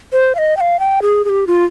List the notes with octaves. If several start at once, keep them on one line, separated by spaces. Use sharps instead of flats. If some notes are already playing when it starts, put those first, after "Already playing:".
C5
F5
D#5
G5
F5
G5
G#4
G#4
G4
F4